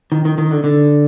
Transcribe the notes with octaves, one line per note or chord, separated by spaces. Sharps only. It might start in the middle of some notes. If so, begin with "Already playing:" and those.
D#3
D#3
D#3
D3
D3